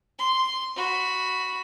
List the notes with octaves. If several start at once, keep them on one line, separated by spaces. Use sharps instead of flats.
C6
F#4 B5